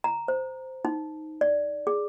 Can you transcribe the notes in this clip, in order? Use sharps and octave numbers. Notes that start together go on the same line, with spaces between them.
A#5
C5
D#4
D5
G#4